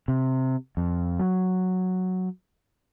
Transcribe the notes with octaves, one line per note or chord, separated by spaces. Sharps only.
C3
F2
F#3